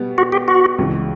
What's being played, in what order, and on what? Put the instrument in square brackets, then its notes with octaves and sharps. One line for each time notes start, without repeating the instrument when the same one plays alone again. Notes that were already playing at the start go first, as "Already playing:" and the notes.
Already playing: [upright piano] B2 G3 B3
[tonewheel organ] F#4
G4
F#4
[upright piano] C#2 C#3 E3